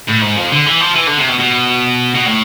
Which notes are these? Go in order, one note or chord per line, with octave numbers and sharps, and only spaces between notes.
A2
G#2
F2
D3
E3
F3
E3
D3
C3
B2
B2
B2
A2